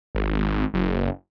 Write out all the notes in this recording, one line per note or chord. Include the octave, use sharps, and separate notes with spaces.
G#1
F#1